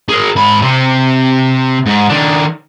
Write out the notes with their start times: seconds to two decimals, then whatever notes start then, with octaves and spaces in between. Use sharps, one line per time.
0.09 G#4 A#4
0.36 G#2 B5
0.62 C3 C4
1.87 G#2
2.10 D#3 D4